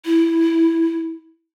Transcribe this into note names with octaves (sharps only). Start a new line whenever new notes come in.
E4